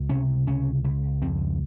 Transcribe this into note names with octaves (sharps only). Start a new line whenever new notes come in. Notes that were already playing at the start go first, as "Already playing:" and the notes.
Already playing: C#2
C3 C#4
C#2 C#4
C#2
F2 C4